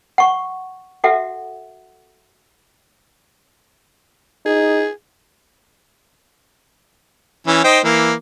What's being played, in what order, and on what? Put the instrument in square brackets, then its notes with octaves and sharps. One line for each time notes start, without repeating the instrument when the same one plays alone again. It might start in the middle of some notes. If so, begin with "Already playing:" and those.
[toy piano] F#5 C#6
F#4 A4 E5 F#5
[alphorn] D#4 [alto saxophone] G#4
[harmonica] E3 C#4
D#4 C5 G5
E3 A#3